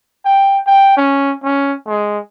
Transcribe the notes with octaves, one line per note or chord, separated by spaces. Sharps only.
G5
G5
C#4
C#4
G#3